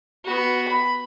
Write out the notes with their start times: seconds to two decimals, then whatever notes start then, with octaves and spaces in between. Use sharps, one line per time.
0.25 B3 F#4
0.68 B5